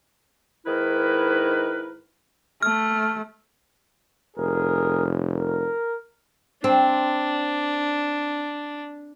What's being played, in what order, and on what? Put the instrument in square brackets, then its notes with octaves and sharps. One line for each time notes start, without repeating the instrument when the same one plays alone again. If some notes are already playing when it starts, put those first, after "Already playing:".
[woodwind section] G#2 D#3 E4 A#4 B4
[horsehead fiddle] A3 [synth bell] F6
[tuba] F1 [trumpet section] G#4 A#4
[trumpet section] A#4
[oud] C4 [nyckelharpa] D4